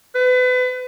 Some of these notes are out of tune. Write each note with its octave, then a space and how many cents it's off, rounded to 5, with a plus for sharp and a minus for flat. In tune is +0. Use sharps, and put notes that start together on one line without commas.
B4 +30